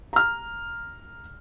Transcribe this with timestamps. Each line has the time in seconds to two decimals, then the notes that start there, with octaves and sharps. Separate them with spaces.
0.13 A#5 F6